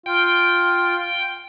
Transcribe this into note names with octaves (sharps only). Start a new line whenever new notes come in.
F4 G5